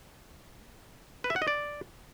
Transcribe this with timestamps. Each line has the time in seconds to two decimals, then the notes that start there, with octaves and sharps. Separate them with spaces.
1.24 B4
1.30 E5
1.36 F#5
1.42 D#5
1.48 D5